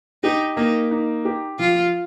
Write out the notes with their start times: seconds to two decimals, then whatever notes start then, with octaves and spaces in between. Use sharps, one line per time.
0.23 D#4 G4
0.57 A#3 D#4
0.91 D#4
1.25 G4
1.59 F3 F4